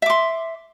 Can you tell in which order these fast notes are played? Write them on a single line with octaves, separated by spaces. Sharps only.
E5 D6 C6